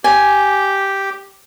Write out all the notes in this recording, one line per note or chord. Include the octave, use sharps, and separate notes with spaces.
G4 G#5